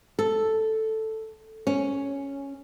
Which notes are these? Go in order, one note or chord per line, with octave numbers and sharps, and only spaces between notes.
A4
C#4